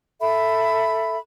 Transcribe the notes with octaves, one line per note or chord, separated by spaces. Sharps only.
A4 E5 B5